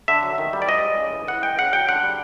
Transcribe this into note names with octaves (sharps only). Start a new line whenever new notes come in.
D3 E5
F#3
D#3
G3
D5
F3 D#5
G#3
C#3
E3
E3 F#5
G#3 G5
C#3 F#5
F#3 G5
D3 F#5
G3